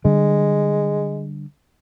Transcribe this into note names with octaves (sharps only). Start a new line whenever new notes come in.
D3 G3 G#3 D4